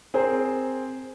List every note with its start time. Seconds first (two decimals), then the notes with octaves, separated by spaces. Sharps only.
0.14 C4 G#4 A#4 C5